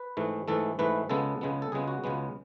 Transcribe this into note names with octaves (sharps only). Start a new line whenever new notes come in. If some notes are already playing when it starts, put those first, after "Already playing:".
Already playing: B4
G#2 E3 A3
G#2 E3 A3 A4
G#2 E3 A3 B4
C#2 C#3 G#3 B3 A4
C#2 C#3 G#3 B3
A4
C#2 C#3 G#3 B3 G#4
F#4
C#2 C#3 G#3 B3